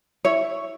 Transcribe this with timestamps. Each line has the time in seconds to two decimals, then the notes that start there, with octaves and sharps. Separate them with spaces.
0.25 E4 C#5